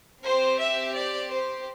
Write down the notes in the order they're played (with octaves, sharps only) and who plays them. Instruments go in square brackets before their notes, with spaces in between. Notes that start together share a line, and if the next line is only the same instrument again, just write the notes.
[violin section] C4 G4 C5
E5
D5
C5